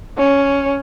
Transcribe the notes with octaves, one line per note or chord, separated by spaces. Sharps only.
C#4